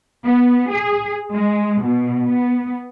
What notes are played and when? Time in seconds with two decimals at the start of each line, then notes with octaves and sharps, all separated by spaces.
0.24 B3
0.71 G#4
1.33 G#3
1.83 B2
2.29 B3